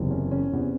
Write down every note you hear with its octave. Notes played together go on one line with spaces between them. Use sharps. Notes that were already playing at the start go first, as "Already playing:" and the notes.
Already playing: F#1 E2 C3 E3
C#4
C#4
E2 C3 E3